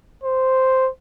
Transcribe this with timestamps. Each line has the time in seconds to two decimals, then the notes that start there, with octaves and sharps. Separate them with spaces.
0.23 C5